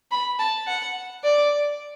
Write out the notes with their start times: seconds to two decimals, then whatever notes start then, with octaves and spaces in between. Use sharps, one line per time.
0.12 B5
0.39 A5
0.67 F#5
1.24 D5